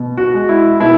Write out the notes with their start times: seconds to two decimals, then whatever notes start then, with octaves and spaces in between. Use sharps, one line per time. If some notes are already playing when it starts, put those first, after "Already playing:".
Already playing: B2
0.17 F#4
0.33 G#3
0.49 E4
0.80 B2 E4